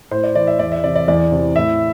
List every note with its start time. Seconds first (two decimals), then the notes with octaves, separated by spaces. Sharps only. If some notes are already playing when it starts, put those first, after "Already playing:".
0.11 A2 C5
0.23 D5
0.35 E3 D5
0.47 E5
0.59 E2 D5
0.72 E5
0.84 C3 E3 D5
0.95 D5
1.08 E2 D5
1.31 C3 E3
1.56 A2 E5